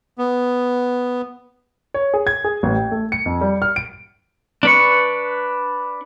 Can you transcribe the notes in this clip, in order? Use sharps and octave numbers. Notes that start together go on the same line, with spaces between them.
B3
C#5
G#4
G#6
G#4
A1
G5
A3
C#7
F2
G3
F6
D7
D4 B4 C#6